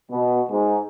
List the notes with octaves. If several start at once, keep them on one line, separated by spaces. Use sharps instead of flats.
B2
G#2